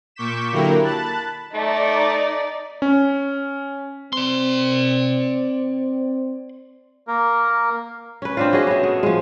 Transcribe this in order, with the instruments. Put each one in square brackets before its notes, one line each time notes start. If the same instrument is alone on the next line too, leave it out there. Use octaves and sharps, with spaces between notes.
[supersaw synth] A#2 C#6 D6 G6 B6 E7
D3 F#3 A#3 E4 G4 A#4
A5 B5 F#6 A6
[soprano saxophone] A3 [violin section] D#4 D5
[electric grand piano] C#4
[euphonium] C4 [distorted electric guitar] D5 C6
[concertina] A#3 A#4
[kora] C#4 B4
C4 D4 F4
C#4 F#4 G#4 D#5
B3 E5
A3
F3 G#3